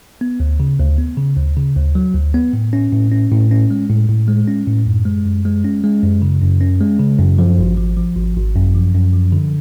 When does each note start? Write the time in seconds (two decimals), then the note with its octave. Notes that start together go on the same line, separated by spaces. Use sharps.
0.21 B3
0.40 D2
0.60 C#3
0.79 D2
0.98 B3
1.17 C#3
1.37 D2
1.57 C#3
1.76 D2
1.95 F#3
2.15 D2
2.34 B3
2.53 A2
2.73 C#4
2.92 A2
3.12 C#4
3.31 A2
3.51 C#4
3.71 G#3
3.89 A2
4.08 A2
4.28 G#3
4.47 C#4
4.67 A2
4.86 F#2
5.05 G#3
5.25 F#2
5.45 G#3
5.64 C#4
5.84 G#3
6.03 F#2
6.22 C#3
6.42 F#2
6.61 C#4
6.80 G#3
6.99 C#3
7.19 F#2
7.38 F3
7.58 G#1
7.77 F3
7.97 F3
8.16 G#1
8.36 G#1
8.55 F#2
8.75 F3
8.94 F#2
9.13 F3
9.32 D3